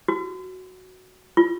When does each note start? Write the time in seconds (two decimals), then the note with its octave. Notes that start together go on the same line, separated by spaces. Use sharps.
0.08 F#4
1.37 F4